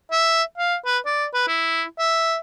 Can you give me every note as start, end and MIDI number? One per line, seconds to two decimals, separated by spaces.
0.12 0.43 76
0.58 0.76 77
0.86 0.98 71
1.06 1.26 74
1.34 1.47 71
1.48 1.84 64
1.99 2.37 76